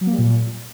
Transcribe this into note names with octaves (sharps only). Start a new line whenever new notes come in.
F#3
A#3
G3
A#2